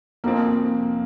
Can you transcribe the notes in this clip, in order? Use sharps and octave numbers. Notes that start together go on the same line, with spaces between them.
F1 F2 F3 A#3 C4